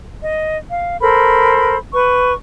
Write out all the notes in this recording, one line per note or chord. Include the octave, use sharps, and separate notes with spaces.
D#5
F5
A4 A#4 C5 B5
B4 C#6